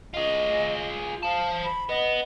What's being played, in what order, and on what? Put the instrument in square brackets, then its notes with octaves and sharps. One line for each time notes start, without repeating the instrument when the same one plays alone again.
[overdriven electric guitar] F4 G#4 [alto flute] D#5
[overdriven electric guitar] C5 A5 [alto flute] F5
[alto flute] B5
[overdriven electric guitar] B3 [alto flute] D#5